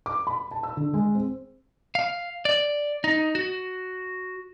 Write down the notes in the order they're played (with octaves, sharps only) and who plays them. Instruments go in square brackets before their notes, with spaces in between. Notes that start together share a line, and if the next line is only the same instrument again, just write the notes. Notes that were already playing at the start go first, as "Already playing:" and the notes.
[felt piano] D6
B5
A5
E6
D3
G#3
C4
[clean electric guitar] F5
D5
D#4
F#4